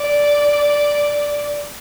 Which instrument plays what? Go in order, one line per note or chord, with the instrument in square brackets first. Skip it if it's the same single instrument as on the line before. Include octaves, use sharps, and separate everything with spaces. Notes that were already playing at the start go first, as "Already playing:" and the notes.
Already playing: [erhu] D5